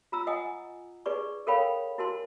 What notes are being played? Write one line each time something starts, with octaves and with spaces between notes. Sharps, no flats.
F4 A#5 E6
D#5 F#5 G#5 D#6
D#4 G#4 B4 D5 C#6
A4 A#4 C#5 F5 G5 B5
E4 F#4 A#4 A5 C6